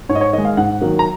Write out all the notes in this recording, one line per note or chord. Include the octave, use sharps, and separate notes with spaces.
G#2 C#5
D#5
C#5
D#3 G#3 D#5
F5
G#2 F#5
D#3 F#3 A#3
A#5